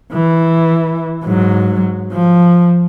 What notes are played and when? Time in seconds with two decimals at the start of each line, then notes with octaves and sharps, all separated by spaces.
0.13 E3
1.23 G#2 F#3
2.13 F3